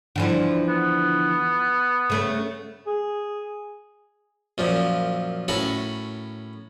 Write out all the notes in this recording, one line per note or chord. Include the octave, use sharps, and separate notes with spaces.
D3 E3 F3
B3
C#3 A3 C#4
G#4
F#2 A#2 F3
A2 C#4 F#4 A4 A#4 B5